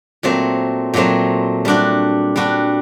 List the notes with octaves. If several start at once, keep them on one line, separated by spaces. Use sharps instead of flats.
A#2 F#3 A3 C4
A#2 F#3 A3 C4
G3 D4 F#4
G3 D4 F#4